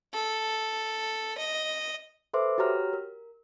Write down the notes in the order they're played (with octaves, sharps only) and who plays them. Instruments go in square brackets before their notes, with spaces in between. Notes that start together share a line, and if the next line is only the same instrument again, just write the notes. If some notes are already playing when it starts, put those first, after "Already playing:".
[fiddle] A4
D#5
[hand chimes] A4 B4 C5 E5 C6 D6
F#4 G4 C#5 A#5 F6
A#4